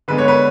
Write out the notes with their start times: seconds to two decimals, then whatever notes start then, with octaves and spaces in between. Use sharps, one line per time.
0.08 D3 G#3 B3 B4
0.18 C#5
0.28 B4